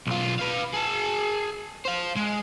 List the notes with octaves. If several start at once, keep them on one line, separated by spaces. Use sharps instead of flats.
B1 F4
B4 F5
G#4 A5
C5 F5
G#3